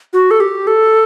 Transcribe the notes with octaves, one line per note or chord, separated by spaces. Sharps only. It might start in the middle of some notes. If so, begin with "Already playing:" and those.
F#4
A4
G4
A4